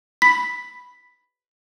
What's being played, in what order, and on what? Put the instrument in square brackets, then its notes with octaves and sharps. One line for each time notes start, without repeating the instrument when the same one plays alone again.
[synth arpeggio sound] B5 [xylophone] B6